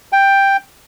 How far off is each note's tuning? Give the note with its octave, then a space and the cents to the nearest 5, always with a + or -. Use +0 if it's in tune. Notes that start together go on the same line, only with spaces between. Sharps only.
G5 +5